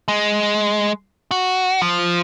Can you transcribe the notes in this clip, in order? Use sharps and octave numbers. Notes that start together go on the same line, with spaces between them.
G#3
F#4
F3